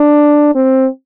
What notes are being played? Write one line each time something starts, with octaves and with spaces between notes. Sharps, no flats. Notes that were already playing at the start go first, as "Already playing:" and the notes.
Already playing: D4
C4